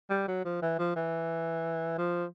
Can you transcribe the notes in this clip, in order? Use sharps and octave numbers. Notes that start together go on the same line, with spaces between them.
G3
F#3
F3
E3
F3
E3
F3